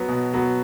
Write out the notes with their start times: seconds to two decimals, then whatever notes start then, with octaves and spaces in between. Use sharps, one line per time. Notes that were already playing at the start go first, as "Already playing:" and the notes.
Already playing: F#3 B3
0.08 B2
0.33 F#3 B3